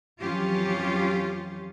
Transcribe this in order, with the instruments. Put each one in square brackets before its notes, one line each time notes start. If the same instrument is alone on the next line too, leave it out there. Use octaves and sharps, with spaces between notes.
[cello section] F2 E3 F#3 C#4 F4 G4